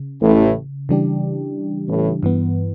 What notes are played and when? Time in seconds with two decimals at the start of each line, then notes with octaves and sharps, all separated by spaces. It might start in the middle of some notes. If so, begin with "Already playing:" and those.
Already playing: C#3
0.22 A1 A2
0.89 C#3 E3 G3 D4 G4
1.89 A1 A2
2.23 G2 E3 B3